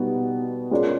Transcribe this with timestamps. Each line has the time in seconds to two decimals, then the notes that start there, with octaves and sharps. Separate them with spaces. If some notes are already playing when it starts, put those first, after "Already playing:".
Already playing: B2 G3 B3 D#4 F#4
0.71 G#3 C#4 F4 A#4 D5